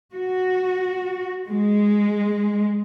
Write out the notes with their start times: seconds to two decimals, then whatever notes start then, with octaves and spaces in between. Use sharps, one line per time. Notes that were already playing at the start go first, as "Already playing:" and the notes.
0.13 F#4
1.48 G#3